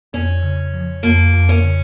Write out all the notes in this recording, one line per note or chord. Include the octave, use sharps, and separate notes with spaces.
F2 C#4
C#3
F3
F2 A#3
F2
C#4
C#3